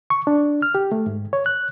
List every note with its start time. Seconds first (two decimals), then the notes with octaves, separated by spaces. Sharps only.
0.10 C#6
0.27 D4
0.62 F6
0.75 G4
0.92 A3
1.06 G#2
1.33 C#5
1.46 F#6